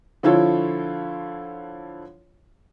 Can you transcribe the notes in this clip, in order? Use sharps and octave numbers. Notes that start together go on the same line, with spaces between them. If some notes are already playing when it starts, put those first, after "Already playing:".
D3 F3 E4 F4 A4 C#5